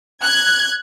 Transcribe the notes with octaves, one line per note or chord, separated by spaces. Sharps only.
F#6 G#6